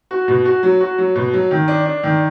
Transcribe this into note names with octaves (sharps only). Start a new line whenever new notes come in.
F#4
B2
F#4
F#3
F#4
F#3
B2
F#3
D#3
D4
D4
D#3